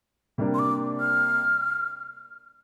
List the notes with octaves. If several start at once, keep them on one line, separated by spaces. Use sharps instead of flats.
C3 G3 A#3 D4 G4
C6
D6
F6